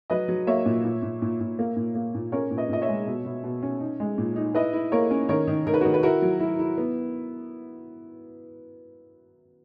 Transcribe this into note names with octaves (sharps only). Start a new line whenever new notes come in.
F#3 B4 D#5
F#3
A#3 C#5 E5
A#2
A#2
A#2
A#2
A#2
A#3
A#2
A#3
A#2
C#4 A#4 C#5
A#2
B4 D#5
A#2 D#5
C#5 E5
G#3
B2
B2
B2
C#4
D#4
G#3
A#2
D#4
E4 B4 D#5
E4
A#3 A#4 C#5
C#4
D#3 A#4 C#5
D#3
D#3 A#4
B4
D#3 F#4 A#4
B4
E4 F#4 A#4
F#3
E4
E4
B3